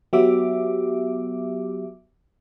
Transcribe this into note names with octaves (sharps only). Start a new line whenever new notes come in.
F#3 B3 G4 E5 D6